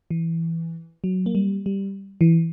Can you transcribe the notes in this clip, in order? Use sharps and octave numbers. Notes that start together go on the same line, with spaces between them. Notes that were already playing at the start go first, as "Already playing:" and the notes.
E3
F#3
A#3
G3
G3
E3